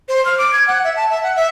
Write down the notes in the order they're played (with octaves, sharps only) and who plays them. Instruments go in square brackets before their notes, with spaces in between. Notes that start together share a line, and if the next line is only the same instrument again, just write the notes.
[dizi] C5
F6
D6
G#6
F#5
E5
A5
E5
F#5
E5